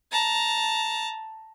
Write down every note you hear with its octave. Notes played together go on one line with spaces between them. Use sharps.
A5 A#5